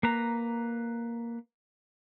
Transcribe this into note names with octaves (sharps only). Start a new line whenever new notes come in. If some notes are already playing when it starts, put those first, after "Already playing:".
A#3 B4 A#5